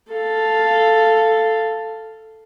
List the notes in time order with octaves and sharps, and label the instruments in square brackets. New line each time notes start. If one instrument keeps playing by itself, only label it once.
[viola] A4 F5